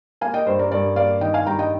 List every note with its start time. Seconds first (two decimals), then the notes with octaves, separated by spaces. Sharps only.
0.21 A#3 F5 G#5
0.34 D#5 G5
0.46 G2 C5
0.59 A#4 D5
0.71 G2 A#4 D5
0.96 A#3 D5 F5
1.21 D#3 D#5 G5
1.34 F5 G#5
1.46 G2 G5 A#5
1.59 D#5 G5